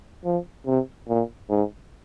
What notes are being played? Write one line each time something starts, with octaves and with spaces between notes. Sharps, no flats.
F3
C3
A#2
G#2